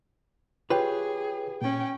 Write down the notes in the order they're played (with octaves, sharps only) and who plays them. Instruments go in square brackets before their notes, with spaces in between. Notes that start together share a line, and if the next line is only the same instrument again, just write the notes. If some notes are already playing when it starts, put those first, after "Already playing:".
[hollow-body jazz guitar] F4 G4 B4 [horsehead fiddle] G#4 [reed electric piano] C#5 G5
[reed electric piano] A#2 [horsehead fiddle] C#4 G5